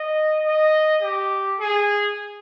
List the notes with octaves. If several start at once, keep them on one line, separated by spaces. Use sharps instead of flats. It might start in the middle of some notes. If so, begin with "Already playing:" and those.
Already playing: D#5
D#5
G4
G#4